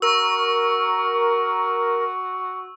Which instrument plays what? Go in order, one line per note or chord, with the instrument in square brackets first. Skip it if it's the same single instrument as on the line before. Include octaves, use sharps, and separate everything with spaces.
[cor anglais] F#4 [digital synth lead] A#4 [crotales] C#6 E6